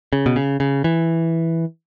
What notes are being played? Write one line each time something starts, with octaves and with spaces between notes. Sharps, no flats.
C#3
B2
C#3
C#3
E3